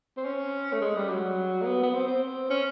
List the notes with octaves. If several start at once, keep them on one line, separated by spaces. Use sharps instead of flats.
C4
C#4
A3
G#3
G3
F#3
A#3
B3
B3
C4
C4
C#4